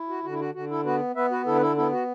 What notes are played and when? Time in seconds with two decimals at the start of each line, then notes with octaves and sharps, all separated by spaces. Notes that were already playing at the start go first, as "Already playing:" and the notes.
Already playing: E4
0.09 F#4
0.24 D3 F#4
0.32 E4
0.40 F#4
0.54 D3 F#4
0.70 E4 A4
0.85 B3 F#4 B4
1.15 B3 B4 E5
1.31 F#4 B4
1.46 D3 E4 A4
1.56 B4
1.61 E4 A4
1.77 B3 E4 A4
1.92 F#4